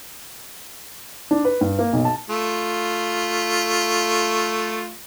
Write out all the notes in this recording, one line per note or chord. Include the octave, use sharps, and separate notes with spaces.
D4
B4
G2
A#3
B1
A5
A3 F4